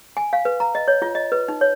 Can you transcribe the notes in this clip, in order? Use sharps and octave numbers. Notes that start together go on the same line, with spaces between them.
G#5
F5
B4
A#5
D#5
C#5
F4
D#5
B4
D#4
C#5